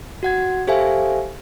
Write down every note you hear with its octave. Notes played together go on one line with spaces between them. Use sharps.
F#4 F#5 G#6
G4 A4 C5 E5 F5 G#5